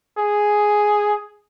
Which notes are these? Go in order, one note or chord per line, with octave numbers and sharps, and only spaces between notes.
G#4